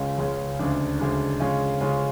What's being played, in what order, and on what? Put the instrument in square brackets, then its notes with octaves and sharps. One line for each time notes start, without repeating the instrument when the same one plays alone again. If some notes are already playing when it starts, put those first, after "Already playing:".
Already playing: [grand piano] C#2 C#3 G#3 C#4 F4
C#2 C#3 G#3 C#4 F4
D2 C#3 G#3 D4
D2 C#3 G#3 D4
C#3 G#3 C#4 F4
C#3 G#3 C#4 F4